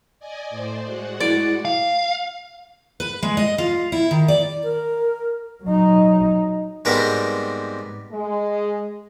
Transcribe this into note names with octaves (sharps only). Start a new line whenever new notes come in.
D5 D#5 G#5
A2 C5 D5
G#3 F#4 F#5
E4 D5
F5
B4
G#3
D#5
F4
E4
D#3
D5
A#4
F#3 D#4
G#2 G3 B3 C4 A#4 G5
G#3